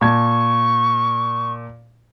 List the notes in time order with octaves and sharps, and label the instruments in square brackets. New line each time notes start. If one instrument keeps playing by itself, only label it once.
[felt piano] A#2 A5 G#6 [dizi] C#6